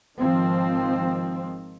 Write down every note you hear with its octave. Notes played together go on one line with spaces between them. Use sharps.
G#1 D#3 F3 C4